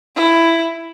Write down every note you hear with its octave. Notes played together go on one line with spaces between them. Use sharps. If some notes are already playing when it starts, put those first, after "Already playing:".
E4